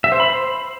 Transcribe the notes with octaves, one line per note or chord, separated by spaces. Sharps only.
E5
C5
B5
C5